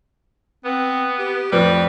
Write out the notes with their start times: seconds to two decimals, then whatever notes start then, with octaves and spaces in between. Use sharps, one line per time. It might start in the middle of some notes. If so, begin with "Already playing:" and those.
0.65 B3 C4
1.19 G4
1.52 F2 A2 G3 B4